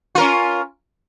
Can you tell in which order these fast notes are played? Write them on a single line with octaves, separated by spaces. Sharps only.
F4 A#4 C#4